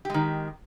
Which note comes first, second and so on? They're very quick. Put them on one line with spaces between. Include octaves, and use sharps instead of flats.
G4 G#3 D#3